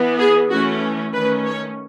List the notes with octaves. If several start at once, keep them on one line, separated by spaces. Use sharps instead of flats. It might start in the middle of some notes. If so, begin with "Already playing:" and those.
Already playing: E3 B3
G#4
E3 A3 C#4 F#4
D#3 A3 C#4 B4
C#5